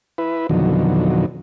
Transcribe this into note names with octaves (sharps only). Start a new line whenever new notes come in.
E4 B4
F2 B2 D3 D#3 F#3